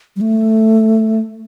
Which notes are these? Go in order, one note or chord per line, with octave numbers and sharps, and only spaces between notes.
G3
A3